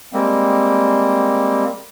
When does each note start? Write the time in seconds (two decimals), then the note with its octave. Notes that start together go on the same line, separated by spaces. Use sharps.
0.13 G3 G#3 A#3 C4